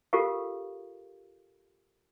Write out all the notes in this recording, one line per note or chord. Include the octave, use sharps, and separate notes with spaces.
F4 G4 A4 A#4 F5